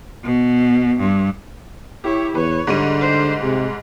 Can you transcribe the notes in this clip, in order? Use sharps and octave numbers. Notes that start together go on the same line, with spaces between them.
B2
G2
E4 G4 C#5
E2 B4 C#5
G#2 D3 G3 D#7
C5
C3 G#3